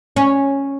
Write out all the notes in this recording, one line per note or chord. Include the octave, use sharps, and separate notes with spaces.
C#4